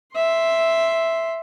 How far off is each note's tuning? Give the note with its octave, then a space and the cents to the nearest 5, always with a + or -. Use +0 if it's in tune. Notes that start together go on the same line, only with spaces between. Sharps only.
E5 +0 C6 +0